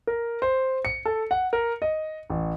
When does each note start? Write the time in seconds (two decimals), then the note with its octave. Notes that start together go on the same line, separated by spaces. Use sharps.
0.07 A#4
0.42 C5
0.85 C#7
1.05 A4
1.31 F#5
1.53 A#4
1.82 D#5
2.30 A1